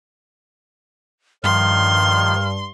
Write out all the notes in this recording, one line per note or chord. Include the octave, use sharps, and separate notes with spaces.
G2 D#3 F3 C6 F6